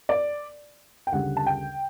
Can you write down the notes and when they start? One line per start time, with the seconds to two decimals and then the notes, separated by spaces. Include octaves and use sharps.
0.09 D5
1.07 G5
1.12 D2 C#3 G3 F#5
1.37 A5
1.47 G5